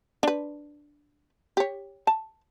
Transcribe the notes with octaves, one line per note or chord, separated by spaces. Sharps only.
D4 B4
G4 C#5
A5